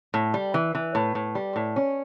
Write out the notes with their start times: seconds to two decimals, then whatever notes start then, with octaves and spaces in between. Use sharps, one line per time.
0.14 A2
0.34 G3
0.54 E3
0.75 E3
0.95 A2
1.15 A2
1.35 G3
1.56 A2
1.76 C#4